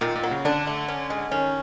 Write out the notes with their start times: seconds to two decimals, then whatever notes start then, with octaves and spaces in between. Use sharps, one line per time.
0.01 A#2 D#3
0.15 A#2
0.23 F#3
0.31 C#3
0.45 D3 D4
0.67 A3
0.88 C#4
1.10 G#3
1.31 D#3 C#4